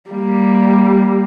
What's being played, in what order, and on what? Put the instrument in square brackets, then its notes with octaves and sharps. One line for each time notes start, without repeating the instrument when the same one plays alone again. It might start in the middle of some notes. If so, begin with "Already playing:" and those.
[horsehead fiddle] G3 A#3